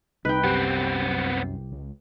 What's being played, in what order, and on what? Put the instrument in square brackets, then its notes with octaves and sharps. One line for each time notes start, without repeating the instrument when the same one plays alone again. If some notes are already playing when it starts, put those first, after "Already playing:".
[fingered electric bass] C2 [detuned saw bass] D#4 [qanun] B4 G5
[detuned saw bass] F#2 [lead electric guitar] B3 C4 [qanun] G4
[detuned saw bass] C#2